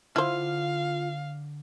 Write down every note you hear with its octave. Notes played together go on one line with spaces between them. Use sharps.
D3 E4 F4 C5 F5 F6